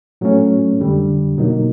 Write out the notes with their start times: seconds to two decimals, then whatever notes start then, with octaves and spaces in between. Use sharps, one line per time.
0.21 A2 F#3 A3 C#4
0.79 F2 D3 G3
1.37 B2 F#3 A#3 D#4